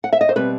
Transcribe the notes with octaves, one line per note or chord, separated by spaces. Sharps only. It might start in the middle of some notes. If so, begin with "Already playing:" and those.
F#5
E5
D#5
C5
B2 G3 C4 B4